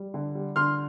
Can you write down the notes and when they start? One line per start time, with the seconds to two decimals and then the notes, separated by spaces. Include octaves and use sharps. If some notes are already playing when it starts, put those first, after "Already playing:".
Already playing: G3
0.14 D3
0.35 G3
0.56 D3 C6 F6